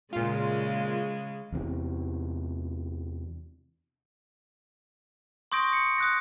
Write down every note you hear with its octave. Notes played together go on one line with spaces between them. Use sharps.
A#2 C#3 G#3 F4
E2 C3 E3
C6 C#6 D#6 G6 A#6 D7
C#7
D#6 F#6 A#6